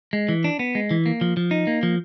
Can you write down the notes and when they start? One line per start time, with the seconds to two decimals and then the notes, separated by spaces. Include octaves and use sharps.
0.13 G#3
0.29 E3
0.44 D4
0.59 B3
0.75 G#3
0.91 E3
1.06 A#3
1.21 F3
1.37 F3
1.51 D#4
1.67 A#3
1.83 F3